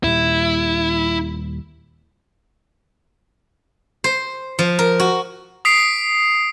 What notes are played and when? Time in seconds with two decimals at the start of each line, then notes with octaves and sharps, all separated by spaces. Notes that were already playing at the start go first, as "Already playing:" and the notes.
0.04 D#2 A#2 G3 E4
4.04 C5
4.59 F3
4.79 A#4
5.00 F#4
5.65 D#6 B6 C7 D7